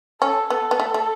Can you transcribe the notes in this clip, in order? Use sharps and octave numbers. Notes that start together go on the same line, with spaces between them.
C#4 A4
B3 A4
B3
A3
A3